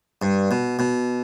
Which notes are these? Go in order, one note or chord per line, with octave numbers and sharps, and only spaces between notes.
G2
B2
B2